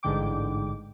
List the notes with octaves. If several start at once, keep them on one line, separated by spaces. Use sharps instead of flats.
A1 G#2 D3 G5 D6